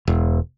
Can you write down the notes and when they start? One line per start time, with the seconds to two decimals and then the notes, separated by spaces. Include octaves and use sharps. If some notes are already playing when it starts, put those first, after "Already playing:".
0.08 E1